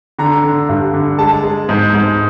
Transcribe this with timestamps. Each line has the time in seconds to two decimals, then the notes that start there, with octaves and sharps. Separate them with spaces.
0.19 D3 A#5
0.44 D3
0.69 G2
0.93 D3
1.19 G#3 A5
1.43 G#3
1.69 G#2
1.94 G#2